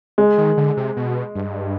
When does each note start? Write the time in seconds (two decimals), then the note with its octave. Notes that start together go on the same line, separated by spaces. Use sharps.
0.18 G#3
0.38 D#3
0.57 D3
0.77 C3
0.96 B2
1.35 G2